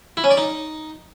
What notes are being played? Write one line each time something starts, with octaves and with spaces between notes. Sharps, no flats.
E4
C#4
D5
D#4